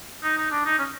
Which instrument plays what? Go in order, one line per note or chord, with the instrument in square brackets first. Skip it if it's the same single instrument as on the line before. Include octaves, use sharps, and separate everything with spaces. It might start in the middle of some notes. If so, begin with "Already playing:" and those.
[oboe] D#4
D#4
D4
D#4
C#4